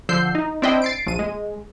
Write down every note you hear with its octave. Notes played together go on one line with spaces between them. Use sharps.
D3 F3 E6 G6 C7
D#4
C4 D4 E4 C5 D#5 G5
A6 C7 D7
A#1 D#7
G#3